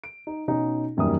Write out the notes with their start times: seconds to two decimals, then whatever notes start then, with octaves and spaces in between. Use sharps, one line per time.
0.04 D7
0.27 D#4
0.48 B2 C#4 D#4
0.97 E1 F#2 D#3 G3 A#3 D#6